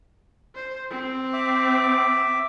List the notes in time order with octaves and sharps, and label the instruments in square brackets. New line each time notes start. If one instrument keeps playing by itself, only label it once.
[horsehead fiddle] C5
C4
[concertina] E5 D6